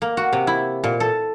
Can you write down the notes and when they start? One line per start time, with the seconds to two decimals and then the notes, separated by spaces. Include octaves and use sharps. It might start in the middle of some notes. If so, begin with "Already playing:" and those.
0.02 A#3
0.17 F#4
0.33 C3
0.47 E4
0.84 A#2
1.00 A4